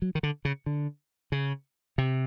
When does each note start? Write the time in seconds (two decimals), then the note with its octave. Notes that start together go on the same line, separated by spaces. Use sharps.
0.02 F#3
0.15 D#3
0.23 D3
0.45 C#3
0.66 D3
1.32 C#3
1.98 C3